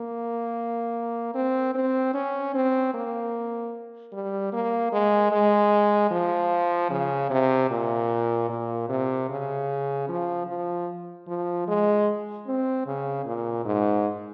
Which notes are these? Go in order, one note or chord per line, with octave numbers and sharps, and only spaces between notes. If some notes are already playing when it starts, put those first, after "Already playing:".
Already playing: A#3
C4
C4
C#4
C4
A#3
G3
A#3
G#3
G#3
F3
C#3
C3
A#2
A#2
C3
C#3
F3
F3
F3
G#3
C4
C#3
A#2
G#2